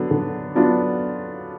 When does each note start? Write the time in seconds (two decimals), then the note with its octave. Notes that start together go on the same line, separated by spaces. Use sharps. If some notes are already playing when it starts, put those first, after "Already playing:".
Already playing: D3 F#3 B3 D4
0.11 D3
0.55 F#3 B3 D4 F4